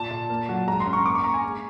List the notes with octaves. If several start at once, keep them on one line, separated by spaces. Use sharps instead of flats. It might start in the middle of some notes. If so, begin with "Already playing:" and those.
Already playing: A#2 A5
A#2
A#3
F#3
G#2 A#5
C6
C#4
C#6
A#3 D6
C#6
A#3 A#5
G#5
G#3